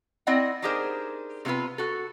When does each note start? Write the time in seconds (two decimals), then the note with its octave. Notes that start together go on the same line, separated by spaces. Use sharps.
0.27 C4 E4 D5 D#5 F#5 G5
0.62 D4 D#4 G4 G#4 A#4 C5
1.45 C3 A3 B3 F4 B4
1.78 F#4 A4